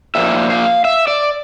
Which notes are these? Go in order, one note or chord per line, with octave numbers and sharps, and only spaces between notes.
A#2 F3 A#3 E5
F5
E5
D5